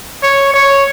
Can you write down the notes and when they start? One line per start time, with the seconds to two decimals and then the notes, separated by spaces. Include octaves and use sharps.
0.23 C#5
0.54 C#5